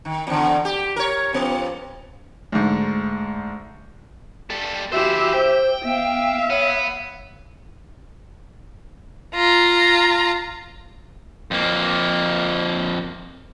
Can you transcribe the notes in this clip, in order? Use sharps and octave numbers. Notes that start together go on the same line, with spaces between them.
D#3
E2 D3
G4
A#4 C#5
F2 B3
D2 G#2
G3 A4
E3 F#4 G4 C5 E5
C5 G5
B3 E5 F5
B3 C#5
F4 A#5
F2 A#3